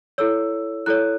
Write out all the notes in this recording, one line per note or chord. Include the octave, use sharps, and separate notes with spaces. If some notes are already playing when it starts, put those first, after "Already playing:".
E4 A4 C#5 E6
E4 A4 C#5 F#6